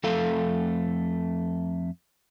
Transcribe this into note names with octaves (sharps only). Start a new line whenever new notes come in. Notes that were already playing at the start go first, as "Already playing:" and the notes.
F2 A3 A4 F5